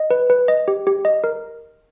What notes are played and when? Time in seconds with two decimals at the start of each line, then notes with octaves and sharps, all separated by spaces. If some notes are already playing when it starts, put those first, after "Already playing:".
Already playing: D#5
0.11 B4
0.30 B4
0.48 D#5
0.68 G4
0.87 G4
1.05 D#5
1.24 A#4